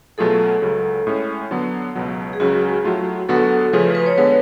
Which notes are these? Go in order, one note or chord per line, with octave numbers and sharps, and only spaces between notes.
B2 F#3 A3 F4 G#4 A4
C#2 C#3 F#3
A2 G#3 C#4
D3 F#3 B3
C#2 B2 F#3
G#4
C#2 C#3 F#3 C#4 F#4
A2 F#3 A3 F4
D2 D3 F#3 B3 F#4 A4
C#3 F3 A3 C#4 G#4 B4
B4
B4
C#5
D3 G#3 B3 B4